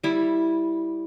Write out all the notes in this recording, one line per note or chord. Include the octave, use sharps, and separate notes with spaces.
G3 E4